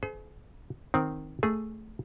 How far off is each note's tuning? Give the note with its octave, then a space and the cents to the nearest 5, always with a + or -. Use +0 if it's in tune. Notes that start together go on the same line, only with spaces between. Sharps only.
G#4 +40 C5 -40
D#3 +0 C4 +0
A3 +0 G#4 +0